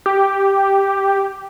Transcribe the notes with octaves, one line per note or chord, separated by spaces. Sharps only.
G4